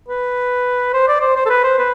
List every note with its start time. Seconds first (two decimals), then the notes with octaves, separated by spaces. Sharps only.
0.08 B4
0.93 C5
1.08 D5
1.21 C5
1.35 C5
1.46 A4
1.49 B4
1.64 C5
1.78 B4